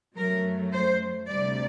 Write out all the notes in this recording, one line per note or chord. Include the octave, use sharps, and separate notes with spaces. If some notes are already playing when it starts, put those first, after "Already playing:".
F#2 F#3 A3 A#4
C5
D2 C3 G3 D5